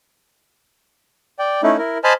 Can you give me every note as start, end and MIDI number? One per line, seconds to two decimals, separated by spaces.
1.39 1.61 74
1.39 1.61 79
1.63 1.77 57
1.63 1.77 61
1.63 1.77 63
1.63 1.77 64
1.78 1.98 64
1.78 1.98 70
2.04 2.13 72
2.04 2.13 75
2.04 2.13 80
2.04 2.13 81
2.04 2.13 83
2.04 2.13 89